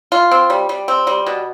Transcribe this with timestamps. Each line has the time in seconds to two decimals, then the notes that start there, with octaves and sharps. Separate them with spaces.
0.12 F4
0.31 C4
0.50 G3
0.69 G3
0.88 C4
1.07 G3
1.27 B2